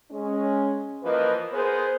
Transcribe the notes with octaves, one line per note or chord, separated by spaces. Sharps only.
G#3 C#4
E3 F3 A#3 A#4 B4 D#5
B3 G#4 A#4 C5